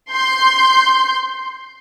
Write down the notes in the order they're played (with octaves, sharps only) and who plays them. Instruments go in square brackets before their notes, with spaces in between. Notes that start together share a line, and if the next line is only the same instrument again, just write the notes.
[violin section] C6 G6